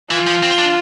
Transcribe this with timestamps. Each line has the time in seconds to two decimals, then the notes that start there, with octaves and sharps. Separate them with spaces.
0.11 E3 F4
0.27 F3
0.43 C4
0.58 D4